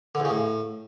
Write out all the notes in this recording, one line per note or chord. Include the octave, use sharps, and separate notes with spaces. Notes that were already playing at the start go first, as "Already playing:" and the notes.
D3
E2
C#3
A2